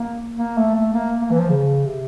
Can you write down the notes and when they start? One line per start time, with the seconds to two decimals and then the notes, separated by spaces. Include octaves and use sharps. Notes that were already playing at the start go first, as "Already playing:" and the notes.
Already playing: A#3
0.38 A#3
0.58 A3
0.75 A3
0.94 A#3
1.21 A#3
1.31 E3
1.40 F3
1.50 C#3
1.85 C3